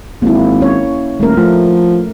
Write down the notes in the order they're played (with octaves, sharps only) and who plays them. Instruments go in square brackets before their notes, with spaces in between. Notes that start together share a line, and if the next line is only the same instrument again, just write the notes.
[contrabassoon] G#1 [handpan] A#3 E4
[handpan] C#4 C#5
[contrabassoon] D#1 [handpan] A3 A#4
[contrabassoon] F3 [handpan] A3